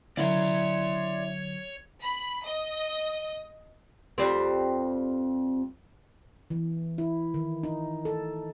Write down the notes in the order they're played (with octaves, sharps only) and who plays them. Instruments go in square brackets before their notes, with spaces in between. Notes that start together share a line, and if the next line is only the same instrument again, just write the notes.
[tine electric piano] D3 F#3 [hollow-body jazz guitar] C#4 E4 A#4 [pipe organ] C#5 [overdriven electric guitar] D5 C6
[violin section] B5
D#5
[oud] F2 G3 C4
[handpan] E3
E4
D#3
D#4
A4